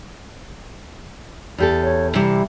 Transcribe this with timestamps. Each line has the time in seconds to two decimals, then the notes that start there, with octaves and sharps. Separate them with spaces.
1.58 E2 G4 A4
1.83 C#5
2.14 C3 E3 G3